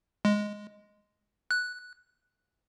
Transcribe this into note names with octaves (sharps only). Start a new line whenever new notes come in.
G#3
F#6